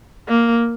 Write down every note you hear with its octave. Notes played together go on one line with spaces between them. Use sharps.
A#3